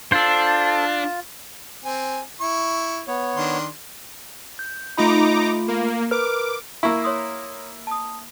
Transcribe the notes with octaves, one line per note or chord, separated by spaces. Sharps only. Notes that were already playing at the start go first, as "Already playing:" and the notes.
D4 F4 A4 C5
C4 G#5
E4 C#6
B3 C#5
D#3 D4 C6
G6
A3 D#4 F4 A#5 B5 D6
A#3
A#4 B4 D6 F6
A#3 E4 C#6
C#5 C6 D#6
A5 D#6